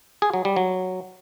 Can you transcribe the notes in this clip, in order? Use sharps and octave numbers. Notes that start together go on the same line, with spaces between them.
G#4
F#3
G3
F#3